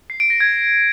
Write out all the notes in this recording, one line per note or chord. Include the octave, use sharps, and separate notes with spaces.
C7
D7
A#6
G#6